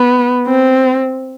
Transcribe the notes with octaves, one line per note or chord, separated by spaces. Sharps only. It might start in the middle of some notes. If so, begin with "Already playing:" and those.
Already playing: B3
C4